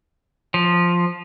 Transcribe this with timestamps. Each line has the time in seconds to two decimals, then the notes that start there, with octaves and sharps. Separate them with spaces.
0.54 F3